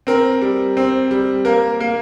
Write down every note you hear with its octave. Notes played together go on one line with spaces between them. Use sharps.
C4 A#4
G3
C4
G3
A#3 A#4
A#3